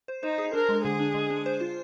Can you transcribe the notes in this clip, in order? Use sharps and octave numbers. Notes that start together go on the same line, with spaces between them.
C5
D#4 C5
G#4
D4 A#4
G#3
D3 G#4
D4
G#3
D4
C5
F4